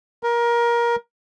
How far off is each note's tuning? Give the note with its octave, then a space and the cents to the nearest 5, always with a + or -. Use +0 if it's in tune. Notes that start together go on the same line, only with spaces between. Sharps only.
A#4 +20